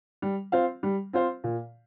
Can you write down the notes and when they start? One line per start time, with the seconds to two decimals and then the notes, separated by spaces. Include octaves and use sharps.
0.22 G3
0.52 C4 F4 C5 F5
0.83 G3
1.13 C4 F4 C5 F5
1.44 A#2